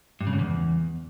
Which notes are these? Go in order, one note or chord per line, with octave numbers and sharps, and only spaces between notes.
G2
C#3
G#2
E2